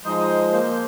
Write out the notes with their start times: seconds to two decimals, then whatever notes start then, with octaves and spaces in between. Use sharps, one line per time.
0.04 F3 G#3 D#4 C5 D#6
0.51 A#3 C5